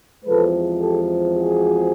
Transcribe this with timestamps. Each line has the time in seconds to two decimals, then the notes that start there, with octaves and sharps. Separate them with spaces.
0.25 E2 C3 F3 G#3 A4 B4
0.81 G4 A4
1.37 F#4 G#4